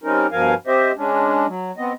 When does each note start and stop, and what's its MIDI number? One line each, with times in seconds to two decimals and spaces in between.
0.04 0.27 55
0.04 0.27 60
0.04 0.27 61
0.04 0.27 63
0.04 0.27 70
0.32 0.54 43
0.32 0.54 47
0.32 0.54 53
0.32 0.54 70
0.32 0.54 77
0.32 0.54 80
0.67 0.92 60
0.67 0.92 67
0.67 0.92 72
0.67 0.92 75
0.67 0.92 76
0.97 1.46 56
0.97 1.46 61
0.97 1.46 62
1.47 1.71 54
1.78 1.93 59
1.78 1.93 60
1.78 1.93 75